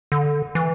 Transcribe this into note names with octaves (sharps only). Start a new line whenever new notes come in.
D3
E3